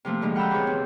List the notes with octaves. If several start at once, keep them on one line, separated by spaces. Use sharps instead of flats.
C3 F3 A3 A#3
A2 D3 F3 G#3 D#4
F4 F#5 G5 A#5 B5 E6
E2 C3 D#4 G#4 C#5 G6
E2 C4